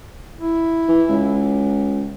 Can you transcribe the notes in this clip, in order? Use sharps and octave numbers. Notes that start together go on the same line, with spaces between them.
E4
E3
C#2